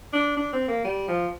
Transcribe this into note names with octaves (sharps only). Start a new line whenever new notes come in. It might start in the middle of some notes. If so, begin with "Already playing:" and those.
D4
D4
C4
A#3
G3
F3